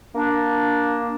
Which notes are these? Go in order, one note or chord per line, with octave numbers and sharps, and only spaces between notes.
A#3 D4